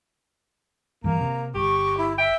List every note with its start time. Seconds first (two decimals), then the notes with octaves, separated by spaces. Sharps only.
1.04 G2 E3 A#3 A#5
1.21 C3
1.55 G1 G4 C#6
1.98 E4
2.18 E5 G5